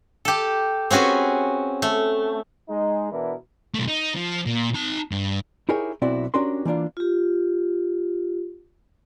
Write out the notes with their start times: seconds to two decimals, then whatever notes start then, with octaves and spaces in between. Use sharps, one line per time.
0.25 G4 A4
0.90 C4 C#4 F#4 G#4 B4
1.82 A3
2.69 G#3 D#4
3.12 B2 E3 B3 D4 E4 A#4
3.74 B1 A3
3.88 D#4
4.16 F3
4.46 A#2
4.74 D#4 A5
5.11 G2
5.69 D#4 E4 G4 G#4 A#4 C#5
6.02 B1 C4 E4 F#4 D5
6.34 C#4 D4 F#4 G4 A#4 C6
6.65 E3 A#3 D4 F4
6.97 F4 G4